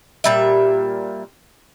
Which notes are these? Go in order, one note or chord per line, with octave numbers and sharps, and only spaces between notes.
A#2 G3 E5